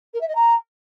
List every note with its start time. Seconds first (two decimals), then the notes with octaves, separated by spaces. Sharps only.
0.14 A#4
0.21 E5
0.28 D#5
0.35 A#5